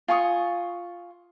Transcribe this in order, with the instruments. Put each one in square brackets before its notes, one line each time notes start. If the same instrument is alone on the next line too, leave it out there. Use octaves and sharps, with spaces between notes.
[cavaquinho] F4 G#5 C#6 D#6